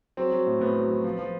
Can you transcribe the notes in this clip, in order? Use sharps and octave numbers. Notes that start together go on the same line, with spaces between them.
F#3 C4
F#3
A2
A2 B3
F#3
F#3
F3
F3